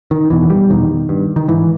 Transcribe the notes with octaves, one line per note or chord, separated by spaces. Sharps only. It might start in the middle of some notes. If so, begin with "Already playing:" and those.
D#3
E2 B2 E3
G3
E2 B2 D#3
G2
D#3
G#2 E3